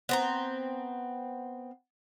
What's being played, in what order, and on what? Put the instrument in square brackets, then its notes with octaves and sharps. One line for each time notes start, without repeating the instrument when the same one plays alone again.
[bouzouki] B3 C4 A#5